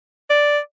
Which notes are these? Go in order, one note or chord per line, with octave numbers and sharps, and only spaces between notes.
D5